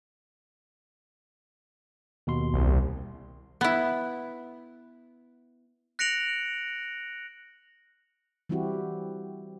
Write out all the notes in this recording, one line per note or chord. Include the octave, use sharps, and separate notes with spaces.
D#2 B2 C6
C2
B3 E4
F#6 A#6 C#7 D7 F7 F#7
E3 G3 C4 E4 F#4 G4